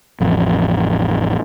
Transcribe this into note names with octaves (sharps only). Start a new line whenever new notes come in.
A1 F2